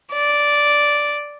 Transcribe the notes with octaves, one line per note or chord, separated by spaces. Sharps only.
D5